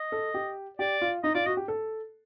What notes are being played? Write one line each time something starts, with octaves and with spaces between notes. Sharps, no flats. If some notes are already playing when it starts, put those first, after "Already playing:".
Already playing: D#5
A4
G4
G4 D5
F4
D#4 D#5
F4 D5
F#4 D#5
G4
A4